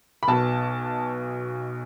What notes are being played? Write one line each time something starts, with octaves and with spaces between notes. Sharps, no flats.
B5
B1 B2 A5